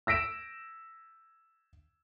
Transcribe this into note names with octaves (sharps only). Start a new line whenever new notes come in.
E6 A#6 B6 D7 E7